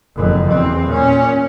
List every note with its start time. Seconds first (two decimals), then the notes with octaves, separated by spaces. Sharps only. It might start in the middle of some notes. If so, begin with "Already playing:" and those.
0.16 F#1 F2
0.51 E2 C4
0.88 A#2 C#4